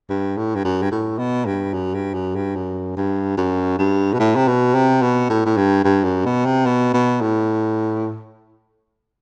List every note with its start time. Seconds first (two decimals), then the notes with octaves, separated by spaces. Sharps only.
0.09 G2
0.37 A2
0.55 G2
0.65 F#2
0.82 G2
0.92 A2
1.19 B2
1.46 G2
1.74 F#2
1.95 G2
2.14 F#2
2.36 G2
2.56 F#2
2.97 G2
3.38 F#2
3.79 G2
4.14 B2
4.20 A2
4.36 C3
4.48 B2
4.74 C3
5.02 B2
5.30 A2
5.46 A2
5.57 G2
5.85 G2
6.04 F#2
6.25 B2
6.45 C3
6.66 B2
6.94 B2
7.21 A2